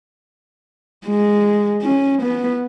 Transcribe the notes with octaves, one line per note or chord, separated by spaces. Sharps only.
G#3
C#4
B3